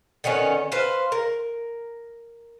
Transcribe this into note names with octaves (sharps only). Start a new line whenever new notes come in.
D3 D#3 B3 C#4
B4 C5 F5
A#4